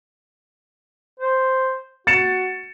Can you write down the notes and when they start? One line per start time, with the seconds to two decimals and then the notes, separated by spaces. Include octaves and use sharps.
1.20 C5
2.07 F#4 A6 C#7 E7